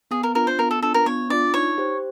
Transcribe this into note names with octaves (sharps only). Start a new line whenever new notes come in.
B3 G#4
A#4
D4 F4 A#4
C5
B3 A#4
A4
D4 F4 A4
A#4
B3 C#5
D4 F4 D5
D#4 C#5
G4 C5